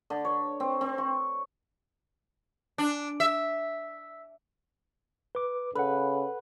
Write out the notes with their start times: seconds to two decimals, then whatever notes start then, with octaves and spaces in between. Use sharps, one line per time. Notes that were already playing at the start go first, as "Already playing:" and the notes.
0.10 D3
0.25 C#5
0.60 C4
0.81 C4
0.98 C#6
2.78 D4
3.20 E5
5.35 B4 D6
5.75 C#3 A4 B4 F#5